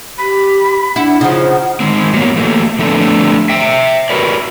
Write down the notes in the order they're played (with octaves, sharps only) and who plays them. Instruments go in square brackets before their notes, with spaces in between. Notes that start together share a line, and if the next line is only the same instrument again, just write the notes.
[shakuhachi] G4 [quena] B5
[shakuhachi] D4 [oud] E4 [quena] F#5
[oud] C#3 F3 [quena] D#4 [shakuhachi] F#5
[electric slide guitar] D#3 G#3 C4
F#3 A#3 B3
E3 A3 A#3
D3 F3 A3 B3 C4 D4
E5 G5
F#4 A#4 B4 D5